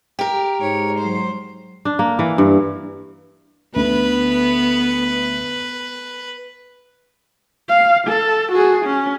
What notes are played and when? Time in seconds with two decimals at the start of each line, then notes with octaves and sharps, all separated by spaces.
0.19 G4 A#4
0.61 G#2 C#5
0.99 F#3 C5
1.85 D4
1.99 A#3
2.19 E3
2.38 G2
3.76 D2 D3 B3 B4
7.68 F5
8.07 A4
8.52 F#4 G#4
8.85 C#4